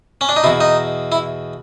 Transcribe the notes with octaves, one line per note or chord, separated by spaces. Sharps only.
C#4
D4
D#4
E2 B2 E4
D#4
E4